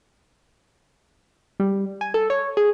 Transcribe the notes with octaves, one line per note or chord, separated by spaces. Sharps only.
G3
G#5
A4
C#5
G#4